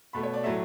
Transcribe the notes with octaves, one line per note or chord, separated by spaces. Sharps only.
B2 A3 B5
C#5
D5
A2 F#3 A3 E5